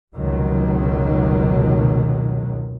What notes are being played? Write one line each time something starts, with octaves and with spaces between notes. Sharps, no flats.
F1 C#2 B2 D#3 F#3